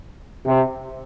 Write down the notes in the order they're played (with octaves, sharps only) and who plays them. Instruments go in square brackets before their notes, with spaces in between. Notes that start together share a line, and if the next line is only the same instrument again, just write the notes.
[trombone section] C3